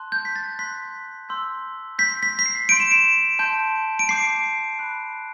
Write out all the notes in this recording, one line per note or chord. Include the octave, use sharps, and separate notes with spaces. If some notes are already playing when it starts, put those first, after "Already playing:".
Already playing: A5 C6 F#6
G6
B6
A6
C6 F#6 B6
C6 E6 G6
C6 G6 B6
B6
B6
C7
C6 G6 D7
E7
D7
A5 C6 G6
D7
A5 D6 G6 C7
B5 D6 F#6